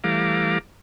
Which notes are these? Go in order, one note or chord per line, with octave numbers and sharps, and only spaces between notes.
E3 G3 A3 F5 A#5 D6